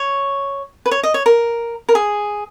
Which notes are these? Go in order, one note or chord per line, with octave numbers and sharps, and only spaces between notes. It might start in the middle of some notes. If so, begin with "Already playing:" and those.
Already playing: C#5
B4
C#5
D#5
C#5
A#4
A#4
G#4